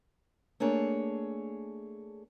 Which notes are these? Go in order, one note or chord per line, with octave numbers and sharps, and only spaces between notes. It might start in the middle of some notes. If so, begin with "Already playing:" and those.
A3 A#3 D4 G#4 C#5